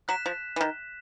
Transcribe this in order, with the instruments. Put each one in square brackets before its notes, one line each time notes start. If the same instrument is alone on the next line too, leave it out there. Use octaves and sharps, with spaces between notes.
[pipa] F#3 [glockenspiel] F#6 B6 E7
[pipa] F3
E3
D#3